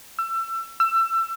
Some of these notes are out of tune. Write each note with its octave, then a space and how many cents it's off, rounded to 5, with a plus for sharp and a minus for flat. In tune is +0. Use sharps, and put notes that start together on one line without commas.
E6 +30
E6 +25